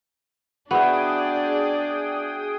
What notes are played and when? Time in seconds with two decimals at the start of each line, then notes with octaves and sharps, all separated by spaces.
0.71 B3 D4 F#4 G#4 D5 E5 G5 D#6